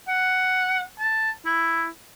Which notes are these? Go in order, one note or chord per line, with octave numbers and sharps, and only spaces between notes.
F#5
A5
E4